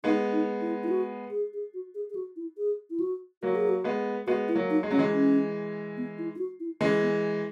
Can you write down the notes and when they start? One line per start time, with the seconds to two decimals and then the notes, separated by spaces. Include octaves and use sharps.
0.04 G#3 B3 D#4
0.32 D#4
0.61 E4
0.83 E4
0.89 F#4
1.30 G#4
1.53 G#4
1.74 F#4
1.95 G#4
2.10 G#4
2.15 F#4
2.36 E4
2.58 G#4
2.90 E4
3.00 F#4
3.42 F#3 A#3 F#4
3.55 G#4
3.69 F#4
3.84 G#3 B3
4.27 G#3 B3 F#4
4.48 E4
4.55 F#3 A#3
4.70 D#4
4.83 G#3
4.90 F#3 C#4
4.98 E3 G#3
5.12 C#4
5.97 B3
6.18 E4
6.35 E4
6.38 F#4
6.60 E4
6.81 E3 G#3 C#4
7.02 B3